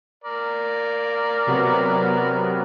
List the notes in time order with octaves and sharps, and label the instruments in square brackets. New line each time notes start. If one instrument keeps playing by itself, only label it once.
[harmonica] A#4 D5
[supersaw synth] C3 F#3 B3